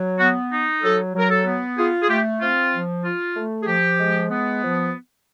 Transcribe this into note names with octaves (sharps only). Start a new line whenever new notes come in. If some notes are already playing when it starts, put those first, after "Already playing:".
Already playing: F#3
B3 F#4
D#4
F#3 A4
F#3 A#4
A4
B3
F4 G#4
G#4
A3 G4
C4 F4
F3
F4
A3
G#4
F3 G4
G#3
B3
F3